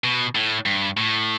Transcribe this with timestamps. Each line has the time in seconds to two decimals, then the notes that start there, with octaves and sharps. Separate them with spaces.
0.04 B2
0.35 A2
0.66 G2
0.97 A2